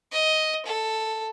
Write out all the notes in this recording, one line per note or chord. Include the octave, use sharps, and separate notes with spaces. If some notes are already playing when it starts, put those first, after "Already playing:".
D#5
A4